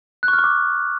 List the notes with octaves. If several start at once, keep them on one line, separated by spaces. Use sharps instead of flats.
F#6
C#6
F6
C#6
D6